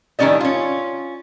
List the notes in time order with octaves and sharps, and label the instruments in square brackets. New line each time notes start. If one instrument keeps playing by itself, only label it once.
[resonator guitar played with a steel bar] A2 D#3 G3 C#4 D5 D#5
C#4 F4